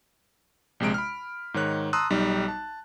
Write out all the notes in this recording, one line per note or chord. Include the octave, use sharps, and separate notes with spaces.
A#1 C3 G#3 D7
B5 F6
G#2 D#3 C#5 F#6
A5 A#5 C6 D#6 E6 F#6
B1 G3 D#4
A5